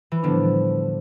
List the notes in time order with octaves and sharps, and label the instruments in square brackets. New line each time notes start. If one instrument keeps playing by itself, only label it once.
[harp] E3
[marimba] A2 G3 B3 D4 [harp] D3 F3